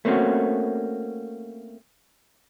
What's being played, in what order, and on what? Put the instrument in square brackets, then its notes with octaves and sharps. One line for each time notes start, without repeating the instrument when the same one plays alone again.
[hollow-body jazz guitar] A3 A#3 C4 C#4 F#4